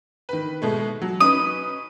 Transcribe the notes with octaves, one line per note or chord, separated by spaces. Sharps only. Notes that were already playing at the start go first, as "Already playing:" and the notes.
D#3 B4
B2 G#3 A3
F#3
C#4 D#4 B4 D#6